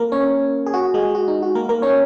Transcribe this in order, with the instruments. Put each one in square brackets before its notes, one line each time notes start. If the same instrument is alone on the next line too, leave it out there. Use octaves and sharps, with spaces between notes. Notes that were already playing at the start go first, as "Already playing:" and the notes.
Already playing: [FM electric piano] A#3 A#4
C#4 C#5
G#4
F#4
G#3 G#4
F#4
D#4
F#4
A#3 A#4
A#3 A#4
C#4 C#5